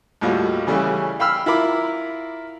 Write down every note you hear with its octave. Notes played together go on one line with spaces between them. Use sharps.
D#2 A2 G3 F4 F#4
C#3 E3 G3 A3 C#4
F5 G5 B5 E6 F6
E4 F4 A#4 B5 D6